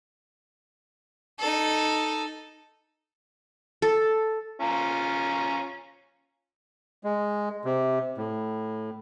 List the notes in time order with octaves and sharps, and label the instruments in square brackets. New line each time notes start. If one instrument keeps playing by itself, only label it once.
[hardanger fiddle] D#4 A4
[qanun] A4
[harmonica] C#4 F4 A#5
[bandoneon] G#3
C3
A2